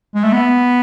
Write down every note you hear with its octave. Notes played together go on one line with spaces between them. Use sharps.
G#3
A3
B3